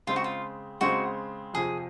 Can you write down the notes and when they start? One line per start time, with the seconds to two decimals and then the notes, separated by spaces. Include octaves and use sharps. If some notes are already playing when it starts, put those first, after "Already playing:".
0.07 C#3 G#3 C4 F4
0.16 F#4
0.24 F4
0.81 C#3 G#3 C4 F#4
1.54 F2 C3 F3 G#4